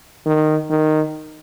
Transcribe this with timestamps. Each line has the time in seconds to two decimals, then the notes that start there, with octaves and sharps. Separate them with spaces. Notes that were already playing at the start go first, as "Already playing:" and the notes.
0.26 D#3
0.70 D#3